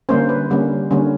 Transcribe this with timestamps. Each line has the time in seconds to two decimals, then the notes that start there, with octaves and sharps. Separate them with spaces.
0.09 D3 G3 A#3 C#4 C5
0.29 B4
0.50 D3 G3 A#3 C#4
0.91 D3 G3 A#3 C#4